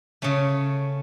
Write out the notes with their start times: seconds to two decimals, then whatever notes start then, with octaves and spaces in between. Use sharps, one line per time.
0.22 C#3 A3 C#4